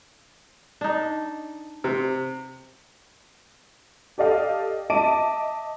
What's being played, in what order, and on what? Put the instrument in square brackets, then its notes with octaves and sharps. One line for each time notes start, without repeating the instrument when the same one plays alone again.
[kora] D4 D#4
[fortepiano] C3
[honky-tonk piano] G4 A4 D5 D#5 F5 G5
D#5 E5 A5 D6 D7 D#7